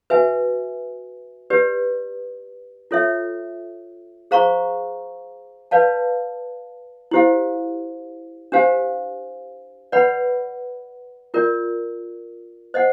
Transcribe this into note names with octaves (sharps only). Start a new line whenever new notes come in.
F#4 B4 E5 G#5
G4 B4 D5
F4 A4 C#5 E5
G#4 C5 F5 A#5 C#6
B4 D5 F5 A5
E4 G4 C5 F5
D4 G4 C5 F5 G#5
B4 D5 F#5 B5
F4 A#4 D5
C5 D#5 F#5